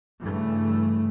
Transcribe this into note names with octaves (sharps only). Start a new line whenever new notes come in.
G2 C#3 E3 A3